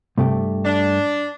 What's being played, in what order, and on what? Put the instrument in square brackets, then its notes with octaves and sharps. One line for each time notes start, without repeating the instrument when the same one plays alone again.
[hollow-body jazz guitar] G2 A3 G4 [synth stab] C3
[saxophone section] D4